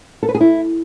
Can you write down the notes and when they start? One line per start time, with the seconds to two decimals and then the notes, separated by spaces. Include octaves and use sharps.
0.23 A4
0.29 B4
0.35 G#4
0.41 E4